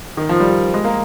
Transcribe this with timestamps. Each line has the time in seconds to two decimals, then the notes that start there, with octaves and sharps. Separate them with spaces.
0.17 D#3
0.29 F3
0.40 G3
0.74 G#3
0.84 A#3